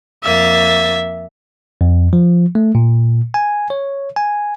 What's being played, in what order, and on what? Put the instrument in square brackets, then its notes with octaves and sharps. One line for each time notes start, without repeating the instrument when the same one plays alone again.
[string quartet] F2 A#3 A6 [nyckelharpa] E5
[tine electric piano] F2
F3
A3
A#2
G#5
C#5
G#5